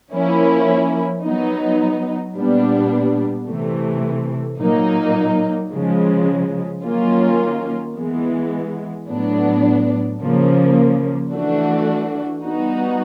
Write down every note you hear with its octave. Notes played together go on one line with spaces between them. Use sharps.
F3 A#3 C#4 E4
F#3 B3 D#4
A#2 G3 B3 D4
C3 E3 A3
A#2 F#3 A#3 D#4
C#3 F3 G#3
D#3 F#3 A#3 C#4 F4
E3 G#3 B3
A2 F#3 B3 D4
C#3 F3 A#3
E3 A3 D4 F#4
G3 B3 D#4 F#4